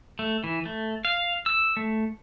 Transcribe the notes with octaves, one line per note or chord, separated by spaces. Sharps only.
A3
E3
A3
F5
E6
A3